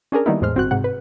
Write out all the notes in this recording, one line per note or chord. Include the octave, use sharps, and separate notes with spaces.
C#4 D4 G#4 A#4
D#3 G3 A#3 B3 D#4 E4
E2 A2 G#3 C5 F6
G1 C4 F#4 F#6
G#2 C3 F#5
B4